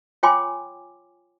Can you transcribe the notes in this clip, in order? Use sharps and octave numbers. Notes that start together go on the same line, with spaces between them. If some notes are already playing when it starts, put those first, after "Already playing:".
F4 C#5 G5 G#5 C6 D6